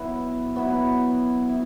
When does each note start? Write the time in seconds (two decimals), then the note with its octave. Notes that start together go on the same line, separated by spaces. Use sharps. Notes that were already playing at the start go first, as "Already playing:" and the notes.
Already playing: F#3 B3 E4
0.56 F#3 B3 E4
1.49 E4